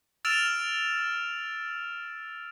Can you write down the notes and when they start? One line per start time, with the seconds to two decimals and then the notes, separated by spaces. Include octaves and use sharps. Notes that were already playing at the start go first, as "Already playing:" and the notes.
0.25 E6 F6 A6 D7 E7 F7